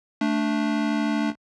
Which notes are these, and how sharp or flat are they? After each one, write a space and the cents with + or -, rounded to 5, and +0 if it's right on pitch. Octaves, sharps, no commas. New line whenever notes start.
A3 +0 D4 -5